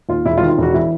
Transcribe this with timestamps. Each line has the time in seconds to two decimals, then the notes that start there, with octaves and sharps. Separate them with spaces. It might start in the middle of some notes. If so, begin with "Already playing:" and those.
0.09 D#2 F4
0.25 E1 E4
0.38 F4
0.41 D#3
0.50 F4
0.58 E1 F#4
0.74 E3 E4